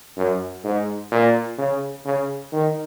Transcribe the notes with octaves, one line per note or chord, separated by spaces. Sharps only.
F#2
G#2
A#2
C#3
C#3
D#3